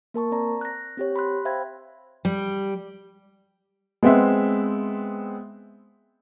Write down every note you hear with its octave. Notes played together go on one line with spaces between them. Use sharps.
A#3 A#4 A5 C#6
C4 D5 A#5
F#6 A#6
C4 G4 C#5
B5 C6 F#6
C5 E5 F5 G5 B5 G#6
G3
G#3 B3 C4 E5